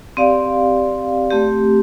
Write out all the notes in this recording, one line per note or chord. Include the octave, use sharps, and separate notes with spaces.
C4 G4 D5 F5
A3 C4 G4